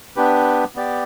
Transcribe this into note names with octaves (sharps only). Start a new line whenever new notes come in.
B3 D4 G4 B4
B3 G4 D5